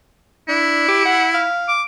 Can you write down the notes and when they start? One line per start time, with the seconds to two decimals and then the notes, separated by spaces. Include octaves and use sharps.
0.49 D4 E4
0.88 G4
1.05 F#5
1.34 F5
1.68 D6